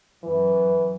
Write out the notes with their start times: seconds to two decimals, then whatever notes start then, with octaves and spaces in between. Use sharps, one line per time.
0.24 F#2 E3